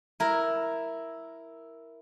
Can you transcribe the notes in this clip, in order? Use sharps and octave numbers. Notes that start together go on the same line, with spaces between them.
E4 A#4